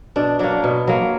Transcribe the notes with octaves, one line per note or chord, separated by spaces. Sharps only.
B2 D4
F#3 A#3 D4
B2
F#3 A#3